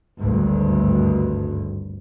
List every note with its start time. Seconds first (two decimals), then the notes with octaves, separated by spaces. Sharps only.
0.22 G#1 D2 G2